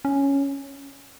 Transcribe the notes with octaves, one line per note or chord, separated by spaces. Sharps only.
C#4